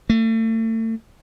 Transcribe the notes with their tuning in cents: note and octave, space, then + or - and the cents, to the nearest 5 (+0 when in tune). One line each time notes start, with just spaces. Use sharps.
A3 +35